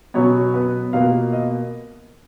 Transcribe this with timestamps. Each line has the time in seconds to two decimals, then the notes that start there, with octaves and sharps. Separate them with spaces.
0.14 B2 F#3 B3 C#4 C#5
0.54 B3 B4
0.93 B2 A#3 F4 F5
1.33 D#5